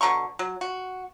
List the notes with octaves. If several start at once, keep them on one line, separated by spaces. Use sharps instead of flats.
B2 D3 A#5 C#6
F#3
F#4